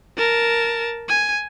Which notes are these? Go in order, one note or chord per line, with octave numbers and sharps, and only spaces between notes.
A#4 A5
G#5